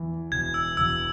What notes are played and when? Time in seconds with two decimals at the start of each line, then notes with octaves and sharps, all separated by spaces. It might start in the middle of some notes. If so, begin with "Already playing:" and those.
Already playing: E2 E3
0.32 E1 G#6
0.54 E6
0.77 E1 E6